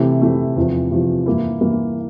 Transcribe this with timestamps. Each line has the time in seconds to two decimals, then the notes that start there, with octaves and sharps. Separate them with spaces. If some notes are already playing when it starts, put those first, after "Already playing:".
Already playing: C3 E3 A3
0.22 C3 E3 A3
0.56 E2 C3 F3
0.91 E2 C3 F3
1.26 G2 E3 A#3 E4
1.61 G2 E3 A#3 E4